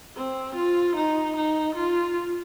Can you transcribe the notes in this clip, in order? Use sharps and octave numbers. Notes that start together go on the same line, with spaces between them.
C4
F4
D#4
D#4
F4